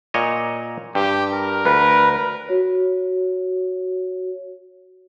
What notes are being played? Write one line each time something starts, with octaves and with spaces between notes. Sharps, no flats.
A#2 C#5 D#5
G2 G4
A#4
D2 B4
F#4 C#5